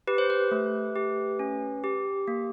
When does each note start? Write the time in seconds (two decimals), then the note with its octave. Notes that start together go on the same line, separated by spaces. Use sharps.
0.07 G4 B4
0.18 C5
0.30 B4
0.51 A3
0.96 G4
1.39 C#4
1.84 G4
2.28 A#3